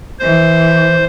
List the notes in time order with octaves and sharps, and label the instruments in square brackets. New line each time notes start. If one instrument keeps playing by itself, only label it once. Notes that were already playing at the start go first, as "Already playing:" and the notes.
[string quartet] E3 [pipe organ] C5